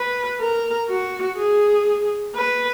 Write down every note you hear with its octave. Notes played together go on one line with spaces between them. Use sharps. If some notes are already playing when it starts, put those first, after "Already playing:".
Already playing: B4
A#4
F#4
G#4
B4